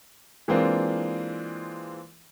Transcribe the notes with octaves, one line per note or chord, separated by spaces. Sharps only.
E3 G#3 A#3 C4 D4 F4